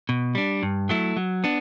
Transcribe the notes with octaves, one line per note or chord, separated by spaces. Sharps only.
B2
G3 D4
G2
F#3 A3 E4
F#3
B3 D4